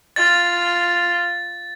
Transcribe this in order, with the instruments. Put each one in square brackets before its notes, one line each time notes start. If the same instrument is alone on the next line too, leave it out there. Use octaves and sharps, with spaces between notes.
[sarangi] F4 [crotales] A6